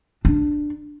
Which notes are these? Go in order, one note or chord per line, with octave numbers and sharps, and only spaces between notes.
D4